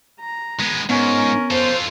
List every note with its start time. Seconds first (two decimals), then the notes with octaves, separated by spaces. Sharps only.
0.20 A#5
0.60 G#3 B3
0.90 G#2 B3 C#4 A#4
1.51 F4 A4 C5